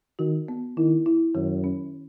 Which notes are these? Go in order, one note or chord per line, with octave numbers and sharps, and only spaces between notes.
D#3 F#4
B3
D#3 E4
E4
F#2 D#3
C#4